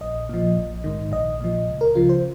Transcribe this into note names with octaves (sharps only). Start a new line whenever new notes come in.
A#1 D#5
A#2 F3
A#1
G#2 D#3
A#1 D#5
A#2 F3
C#2
A#4
C#3 F3 F4
C5